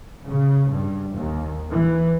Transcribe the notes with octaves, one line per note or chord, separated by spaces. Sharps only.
C#3
G2
D#2
E3